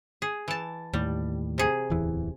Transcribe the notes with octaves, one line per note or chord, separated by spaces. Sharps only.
G#4
E3 A5
D#2 A2 G3
C3 G#4
D1 E2 E3